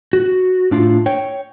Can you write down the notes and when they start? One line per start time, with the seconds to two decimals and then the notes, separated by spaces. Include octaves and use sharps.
0.13 F#4
0.71 A2 D4 F4
1.06 C#5 G5